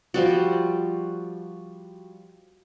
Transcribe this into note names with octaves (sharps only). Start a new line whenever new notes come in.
F3 G3 F#4